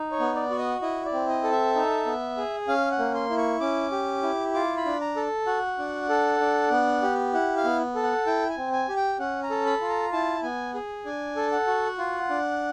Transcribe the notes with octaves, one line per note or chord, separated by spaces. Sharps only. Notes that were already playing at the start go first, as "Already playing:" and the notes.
Already playing: D#4
C#5
B3
D5
F#4
D#5
E4 D#5
D5
C4
D#5
A4
E5
D#4
B3
G#4
C#4 F5
F#5
A#3
C6
E4
C#6
C#4 D6
G4
E4
F4 D6
B5
D4
A#5
A4
F#4 F#5
D4
A4
D4
B3
G4
E4 F#5
F5
B3
A4
F#5
E4 G5
G#5
C4
G#5
G4
G5
C#4 F#5
A#5
A4
B5
F4
A#5
E4 A5
B3 G#5
G#4
D4 G#5
A4
F#5
F#4
F4
D4